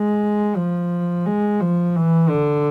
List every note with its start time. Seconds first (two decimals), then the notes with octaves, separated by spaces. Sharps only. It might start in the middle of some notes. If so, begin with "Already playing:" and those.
Already playing: G#3
0.56 F3
1.26 G#3
1.61 F3
1.96 E3
2.30 D3